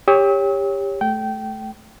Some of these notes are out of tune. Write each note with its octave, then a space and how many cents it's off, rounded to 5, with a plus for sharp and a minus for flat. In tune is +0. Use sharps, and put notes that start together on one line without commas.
G4 +25 C#5 +0 E6 -40
A3 -20 G5 -20